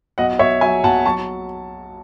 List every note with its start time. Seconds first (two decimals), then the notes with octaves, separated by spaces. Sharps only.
0.18 B1 D#5 F#5
0.39 B1 C#5 E5
0.61 F#3 E5 G#5
0.84 B1 F#5 A5
1.05 F#3 A5 C#6